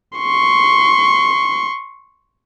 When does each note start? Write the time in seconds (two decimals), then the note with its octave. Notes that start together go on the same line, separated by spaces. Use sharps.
0.18 C6 C#6